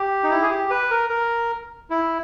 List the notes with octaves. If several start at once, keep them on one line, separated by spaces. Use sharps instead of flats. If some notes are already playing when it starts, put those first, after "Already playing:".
Already playing: G4
D#4
E4
G#4
G4
B4
A#4
A#4
E4